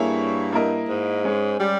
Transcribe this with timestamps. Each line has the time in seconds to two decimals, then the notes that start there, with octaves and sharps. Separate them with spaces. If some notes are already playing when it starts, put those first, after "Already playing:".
Already playing: G2 A#3 E4 G#4 C#5 E5
0.53 A#3 E4 A#4 D#5
0.88 G#2
1.24 G#3 C#4 G#4
1.59 G3